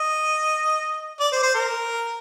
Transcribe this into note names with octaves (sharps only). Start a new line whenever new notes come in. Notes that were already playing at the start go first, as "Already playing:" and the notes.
Already playing: D#5
D5
C5
C5
A#4